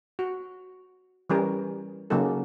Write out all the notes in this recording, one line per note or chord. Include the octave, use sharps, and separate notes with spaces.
F#4
E3 G3 C#4 A#4
C#3 F#3 A#3 D#4 A4